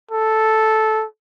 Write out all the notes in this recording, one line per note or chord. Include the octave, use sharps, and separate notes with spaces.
A4